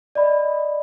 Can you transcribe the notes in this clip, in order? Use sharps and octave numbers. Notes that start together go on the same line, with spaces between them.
D5 D#5 B5